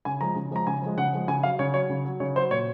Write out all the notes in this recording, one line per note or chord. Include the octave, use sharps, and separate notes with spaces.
C#3 G#5
F3 G#3 A#5
C#3
F3 G#3 A#5
C#3 G#5
F3 G#3
C#3 F#5
F3 G#3
C#3 G#5
F#3 F5
C#3 C#5
F#3 C#5
C#3
F#3
C#3 C#5
F#3 C5
A#2 C#5